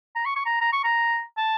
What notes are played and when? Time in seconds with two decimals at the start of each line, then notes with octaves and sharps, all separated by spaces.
0.15 A#5
0.25 C#6
0.36 C#6
0.46 A#5
0.61 A#5
0.72 C#6
0.84 A#5
1.37 A5